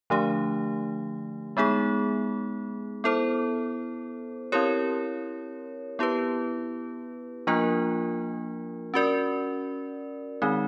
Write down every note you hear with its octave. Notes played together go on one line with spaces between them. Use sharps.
D3 F3 A3 D4 G4
G#3 B3 D#4 G#4
B3 E4 A4 C5
C4 E4 G4 A#4 C#5
B3 E4 G4 B4
F3 A#3 D4 F4 A#4
C#4 F#4 A#4 D5
D#3 G#3 C4 D#4